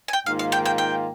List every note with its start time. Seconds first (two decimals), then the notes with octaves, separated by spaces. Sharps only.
0.08 G#5
0.13 G5
0.26 G#2 D#3 A#3 F4 F5
0.39 F5
0.52 G5
0.66 G5
0.78 G5